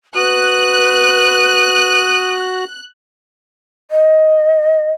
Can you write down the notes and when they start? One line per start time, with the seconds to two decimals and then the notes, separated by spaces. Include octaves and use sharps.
0.15 F#4 B4 D#6 F#6
3.91 D#5